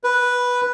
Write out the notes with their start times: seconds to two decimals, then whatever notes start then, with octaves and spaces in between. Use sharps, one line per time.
0.04 B4